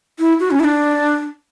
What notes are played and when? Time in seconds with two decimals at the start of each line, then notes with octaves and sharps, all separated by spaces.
0.19 E4
0.40 F#4
0.51 C#4
0.60 E4
0.64 D4